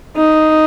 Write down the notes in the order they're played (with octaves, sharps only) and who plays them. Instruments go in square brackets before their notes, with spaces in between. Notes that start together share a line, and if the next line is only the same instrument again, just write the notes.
[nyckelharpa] D#4